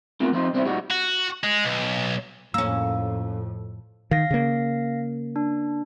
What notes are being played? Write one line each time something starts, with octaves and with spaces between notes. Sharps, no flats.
A3 B3 C4 F4 A#4
F2 C4 D#4 F4
C2 C4 D4 E4
A#2 G3 D#4 F#4
F#4
G#3
B1
F2 A2 A#3 C#4 E6
D#3 F5 A#6
C#3 A#3
D4